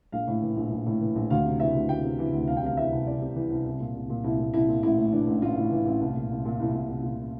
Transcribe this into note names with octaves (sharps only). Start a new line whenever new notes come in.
A#1 F5
A2
E3
A#1
A#1
A2
E3
A#1
D2 F5
C3
E3 E5
D2
D2 G5
C3
E3
D2
C2 F5
G5
C3 F5
E3 E5
C2
C2 D5
C3
E3
C2
C2
A#2
C2
A#2
C2 E4
A#2
C2 E4
A#2
A1 E4
A2
E3 D4
A1
A1 F4
A2
E3
A1
C2
A#2
C2
A#2
C2 E4
A#2
C2
A#2